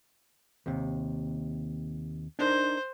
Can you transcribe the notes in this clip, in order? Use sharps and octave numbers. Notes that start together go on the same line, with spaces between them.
D#2 C3
D4 D#4 A#4 C5